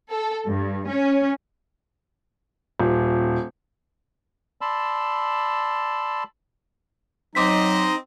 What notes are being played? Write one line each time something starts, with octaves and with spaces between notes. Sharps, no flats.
A4
G2
C#4
D#1
D5 A5 B5 C6 E6
F#3 C4 D#4 C5 D#5 D6 B6